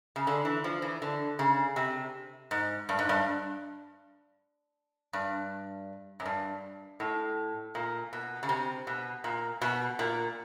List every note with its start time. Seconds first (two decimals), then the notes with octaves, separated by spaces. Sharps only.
0.16 C#3
0.27 D3
0.45 E3
0.64 F3
0.82 E3
1.02 D3
1.39 C#3
1.76 C3
2.51 G#2
2.89 G2
2.99 G#2
3.09 G2
5.13 G2
6.20 F#2
6.26 G2
7.00 A2
7.75 A#2
8.13 B2
8.43 C#3
8.49 C3
8.87 B2
9.24 A#2
9.62 B2
9.99 A#2